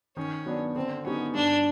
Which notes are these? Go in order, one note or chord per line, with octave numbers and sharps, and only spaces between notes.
D#3 C#4
F#3 B3 D4
D3 C4
F#3 B3 C#4 D#4 G4
G2 D4